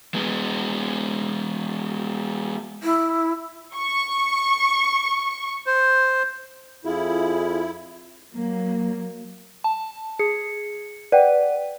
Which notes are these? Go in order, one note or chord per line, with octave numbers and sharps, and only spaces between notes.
G#3 B3
E4
C#6
C5
F2 E4 F4 G#4
F#3 A#3
A5
G#4 C#7
B4 D5 F#5 G5